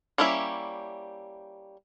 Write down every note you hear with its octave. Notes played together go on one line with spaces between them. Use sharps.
G3 A#3 C#4 E4 E5